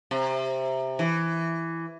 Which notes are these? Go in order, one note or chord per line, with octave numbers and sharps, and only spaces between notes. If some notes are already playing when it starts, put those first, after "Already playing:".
C3
E3